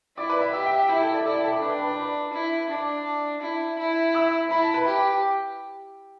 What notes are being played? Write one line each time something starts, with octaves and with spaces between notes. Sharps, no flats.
E4 D5 D6
B4 B5
E5
G4 E5
G5
E5
E4 G5
A4 A5
D5 D6
E4 A4 A5
G5
A4 A5
D5 D6
D4 B4 B5
G5
B4 B5
D5 D6
B4 B5
E4
D4 D5 D6
E4
E4
E5 E6
E4 B5
A5
B4 B5
G4